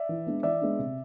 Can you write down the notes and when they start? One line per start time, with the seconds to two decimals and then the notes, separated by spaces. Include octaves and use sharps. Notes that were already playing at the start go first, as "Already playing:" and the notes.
Already playing: D5 E5
0.09 E3
0.27 G#3 B3 D4
0.43 E3 D5 E5
0.61 G#3 B3 D4
0.79 C3